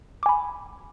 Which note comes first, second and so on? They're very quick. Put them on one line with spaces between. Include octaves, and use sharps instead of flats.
D6 G#5 B5